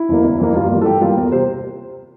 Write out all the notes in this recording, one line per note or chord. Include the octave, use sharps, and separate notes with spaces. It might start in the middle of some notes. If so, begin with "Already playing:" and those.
Already playing: E4
F2 E3 A#3
G1
F2 E3 A#3
G2 F4
E3 G3 A#3
A4
G2 G4
E3 G3 A#3 F4
E2 A#4
C3 C5